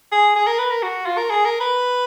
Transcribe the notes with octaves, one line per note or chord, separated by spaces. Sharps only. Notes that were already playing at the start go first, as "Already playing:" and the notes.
G#4
G#4
A#4
B4
A#4
F#4
F4
A#4
G#4
A#4
B4